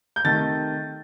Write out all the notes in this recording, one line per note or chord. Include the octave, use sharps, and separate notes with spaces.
G6
C3 D#3 A3 D#4 A6